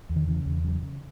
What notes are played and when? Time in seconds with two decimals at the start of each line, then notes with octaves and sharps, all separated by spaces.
0.09 E2
0.16 D#3
0.28 C#3 E3
0.46 E2
0.64 C#3 F#3
0.83 C#3